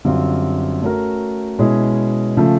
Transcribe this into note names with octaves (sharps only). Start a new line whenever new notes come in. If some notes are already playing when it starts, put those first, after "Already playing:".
F#2 D3 G3 C4 F4
A3 C#4 F#4 A#4
B2 G#3 C#4 E4 G#4
C#3 F3 A3